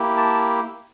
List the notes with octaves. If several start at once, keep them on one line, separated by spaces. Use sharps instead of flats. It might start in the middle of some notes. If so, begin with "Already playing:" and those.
Already playing: A#3 E4 G4
A5